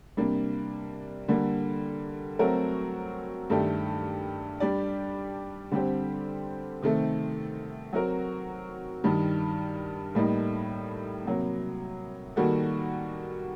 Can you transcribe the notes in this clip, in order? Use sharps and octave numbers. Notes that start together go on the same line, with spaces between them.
C3 G3 A#3 D4
D3 G3 A#3
F#3 A3 C4 F#4 A#4
G2 D#3 A3 D4 G4
G3 D4 G4 D5
D3 G3 C4 G4 C5
C3 D#3 A3 C4
F#3 C4 F#4 A#4
G2 D#3 G3
A2 G3 A#3 D#4
C3 F#3 A#3
D#3 G3 A#3 F#4 A4